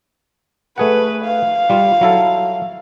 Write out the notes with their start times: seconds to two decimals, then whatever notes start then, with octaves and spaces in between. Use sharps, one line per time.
0.78 A3 G#4 B4 F#5
1.24 F5
1.70 G3 F4
2.01 F#3 E4 A4